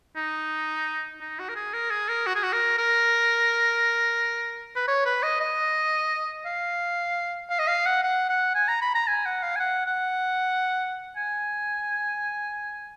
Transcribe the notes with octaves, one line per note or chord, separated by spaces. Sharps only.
D#4
D#4
F#4
A#4
G#4
A#4
G#4
A#4
F#4
G#4
F#4
A#4
A#4
B4
C#5
B4
D#5
D#5
F5
F5
D#5
F5
F#5
F#5
F#5
G#5
A#5
B5
A#5
G#5
F#5
F5
G#5
F#5
F#5
G#5